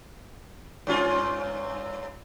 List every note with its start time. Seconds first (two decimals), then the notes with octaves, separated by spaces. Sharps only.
0.87 G2 C#4 F4